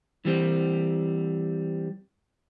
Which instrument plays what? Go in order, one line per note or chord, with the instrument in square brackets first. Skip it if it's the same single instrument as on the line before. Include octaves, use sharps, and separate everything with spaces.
[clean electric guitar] E3 G3 C4